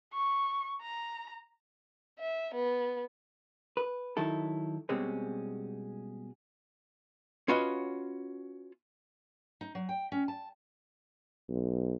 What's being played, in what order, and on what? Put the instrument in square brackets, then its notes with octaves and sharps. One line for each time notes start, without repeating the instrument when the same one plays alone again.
[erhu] C#6
A#5
[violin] E5
B3
[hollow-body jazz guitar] B4
D#3 F#3 E4 A4
B2 G3 G#3 C4 C#4
C#4 F4 F#4 B4 C#5 D#5
[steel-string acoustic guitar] D#4
F#3
G5
C#4
A5
[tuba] B1